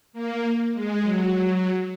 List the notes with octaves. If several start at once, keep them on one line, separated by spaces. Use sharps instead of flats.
A#3
G#3
F#3
F#3